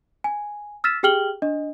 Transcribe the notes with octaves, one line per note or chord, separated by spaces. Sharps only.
G#5
E6 F6 A6 B6 E7
G4 G#4 G5 F6 F#7 G7
D4 D#5